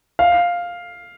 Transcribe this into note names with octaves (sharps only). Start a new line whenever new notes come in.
F5